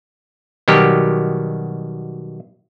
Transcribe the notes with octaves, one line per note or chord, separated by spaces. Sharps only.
B2 D#3 F#3 G3 G4 A#4